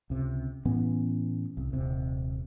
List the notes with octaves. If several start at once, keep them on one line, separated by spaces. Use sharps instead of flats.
C#2 C3
A2 E3 B3 C#4
C2
D#1 C3